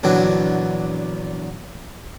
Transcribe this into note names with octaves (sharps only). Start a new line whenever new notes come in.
A#1 E2 D3 F#3